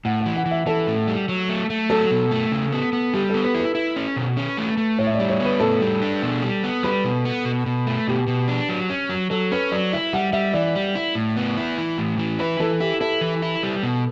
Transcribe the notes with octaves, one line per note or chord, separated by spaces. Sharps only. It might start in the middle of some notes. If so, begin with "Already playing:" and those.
A2 F#5
F#5
E3
F#5
E3
E5
E3 A4
A2
G3
F#3
A3
A3
F#3 A4
B2
A3
C#3
B3
B3
G3 G4
B3 A4
B4
E4
B4
E4
C#4
B2
C#4
A3
A3
A2 C#5
E5
G3 D5
C#5
B3 B4
A2 A4
G3
D4
B2
G3
B3
G3 B4
B2
B3
B2
B2
A3
B2 G4
B2
D4
F#3
C#4
F#3
F#3 A4
C#4 B4
F#3 D5
E4 E5
G3 F#5
G3 E5
E3 D5
G3
E4
A2
B3
E4
E3
A2
E3
E4 B4
E3 A4
E4 G4
E4 A4
E3
E4
G3
B2